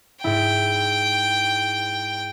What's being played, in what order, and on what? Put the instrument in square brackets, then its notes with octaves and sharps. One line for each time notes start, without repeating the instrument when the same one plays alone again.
[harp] G#2 E4 [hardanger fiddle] G5